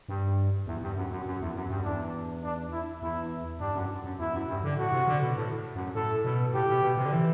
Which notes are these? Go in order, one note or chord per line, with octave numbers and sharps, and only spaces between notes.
G2
E2
G2
F#2
F#2
F#2
E2
F#2
G2
E2 D4
D4
E4
E2 E4
G2 D4
F#2
F#2
E2 E4
F#2
G2
D3
A2 F#4
C3
D3
B2
A2
F#2
A2 A4
B2
A2 G4
B2
B2
C3
D3
E3